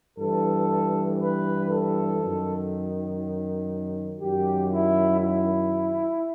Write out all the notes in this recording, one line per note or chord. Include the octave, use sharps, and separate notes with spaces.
G2 E3 A4
B4
A4
F#2 D#3
F#2 D#3 G4
E4
E4